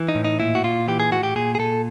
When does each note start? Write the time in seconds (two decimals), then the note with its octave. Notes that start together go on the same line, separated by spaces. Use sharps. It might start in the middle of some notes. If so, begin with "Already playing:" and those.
Already playing: E3
0.09 D#4
0.15 A2
0.25 D#4
0.40 A#2 E4
0.55 F#4
0.64 A#2 F4
0.88 E3 G4
1.00 G#4
1.12 A2 F#4
1.23 G4
1.36 A#2 G#4
1.55 G#4
1.59 A#2 A4